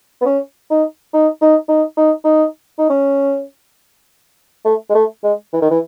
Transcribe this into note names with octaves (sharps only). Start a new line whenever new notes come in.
B3
C#4
D#4
D#4
D#4
D#4
D#4
D#4
D#4
C#4
A3
G#3
A3
G#3
E3
D#3
E3